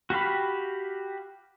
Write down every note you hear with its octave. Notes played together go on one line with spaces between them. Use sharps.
F#4 G4 F5 B5